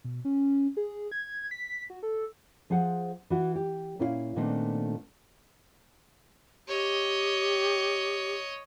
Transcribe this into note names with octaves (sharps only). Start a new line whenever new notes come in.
B2
C#4
G#4
G#6
B6
F#4
A4
F3 G#4 C5 F#5
E3 F#4
G4
A#2 C#4 E4 C#5 F5
A#2 D#3 A3 B3 C4 D4
G4 C#5 D#5